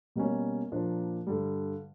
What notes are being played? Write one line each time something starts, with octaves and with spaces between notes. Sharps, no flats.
B2 G3 A#3 C#4
A#2 F3 A#3 D4
G2 D3 G3